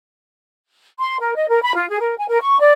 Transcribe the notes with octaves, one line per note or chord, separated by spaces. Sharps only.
C6
A#4
D#5
A#4
B5
F4
G#4
A#4
G#5
A#4
C#6
D5